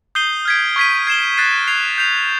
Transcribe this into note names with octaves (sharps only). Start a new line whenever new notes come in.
D#6 G6 C7 D#7 G7
F6 G#6 B6 D7
C#6 F6 G#6 B6 D#7
G#6 C7 E7 G7
F#6 A6 C7 D#7
G#6 C7 F7
G6 C7 F7